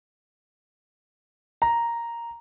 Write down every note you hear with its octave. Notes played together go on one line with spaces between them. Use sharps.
A#5